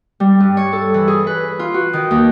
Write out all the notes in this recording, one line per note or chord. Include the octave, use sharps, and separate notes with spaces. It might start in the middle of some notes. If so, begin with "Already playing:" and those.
G3
G2
C#5
A4
E3
G#4
B4
F4
F#4
D#3
D#2